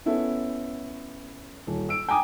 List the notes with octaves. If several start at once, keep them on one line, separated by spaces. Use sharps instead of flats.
B3 C#4 E4 A4
D#1
E6 D7
G5 G#5 A#5 D6 D#6